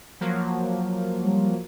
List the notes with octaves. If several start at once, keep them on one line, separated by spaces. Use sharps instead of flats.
F3 F#3 A#3
G3